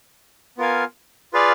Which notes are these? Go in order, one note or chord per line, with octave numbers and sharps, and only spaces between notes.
B3 F4 A#4 F5 G#5
F4 G#4 B4 D5 F5